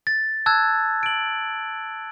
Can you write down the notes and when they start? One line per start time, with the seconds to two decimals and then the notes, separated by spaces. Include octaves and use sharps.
0.07 A6
0.46 A5 E6 F#6 G#6
1.03 D7 F#7